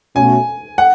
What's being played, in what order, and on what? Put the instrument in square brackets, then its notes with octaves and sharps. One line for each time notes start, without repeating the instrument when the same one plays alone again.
[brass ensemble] B2 A3 C#4 F#4 [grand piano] G#5
[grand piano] F#5